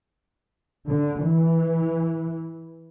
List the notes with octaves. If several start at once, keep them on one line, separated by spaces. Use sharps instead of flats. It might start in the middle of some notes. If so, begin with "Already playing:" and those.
D3
E3